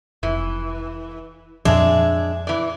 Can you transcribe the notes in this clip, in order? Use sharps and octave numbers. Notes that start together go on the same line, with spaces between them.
F1 E3
F2 A#2 F3 G#3 D4 G#4 E5
E3 D5